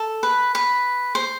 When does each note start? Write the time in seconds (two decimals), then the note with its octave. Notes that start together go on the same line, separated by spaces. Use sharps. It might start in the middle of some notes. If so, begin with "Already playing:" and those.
Already playing: A4
0.23 B4
0.55 B4
1.15 C5